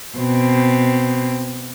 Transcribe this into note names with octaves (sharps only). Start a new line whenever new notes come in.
B2 C4